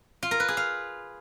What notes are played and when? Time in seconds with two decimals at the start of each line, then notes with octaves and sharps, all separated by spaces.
0.23 F4
0.31 A#4
0.40 B4
0.48 G#4
0.57 F5